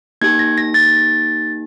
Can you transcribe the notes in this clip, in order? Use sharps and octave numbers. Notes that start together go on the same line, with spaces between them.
A#3 D#4 G4 G#6
A#6
A#6
A6